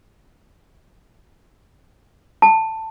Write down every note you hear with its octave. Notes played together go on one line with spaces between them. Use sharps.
A5